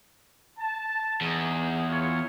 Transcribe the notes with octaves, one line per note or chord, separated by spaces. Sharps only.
A5
E2 D#4 G#4
F4 G#4 C#5